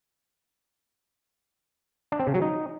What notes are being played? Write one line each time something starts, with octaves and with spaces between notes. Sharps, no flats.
D4
C4
C#3
F#3
D#4